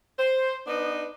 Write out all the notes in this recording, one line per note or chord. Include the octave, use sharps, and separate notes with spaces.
C5
B3 D4 D#4 B4